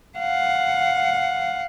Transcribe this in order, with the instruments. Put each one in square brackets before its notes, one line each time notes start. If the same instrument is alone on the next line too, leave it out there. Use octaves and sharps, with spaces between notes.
[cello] F5 F#5